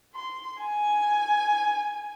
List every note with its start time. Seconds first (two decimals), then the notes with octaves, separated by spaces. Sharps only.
0.15 C6
0.62 G#5